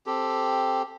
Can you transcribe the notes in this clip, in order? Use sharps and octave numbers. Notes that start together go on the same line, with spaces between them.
C4 G4 A4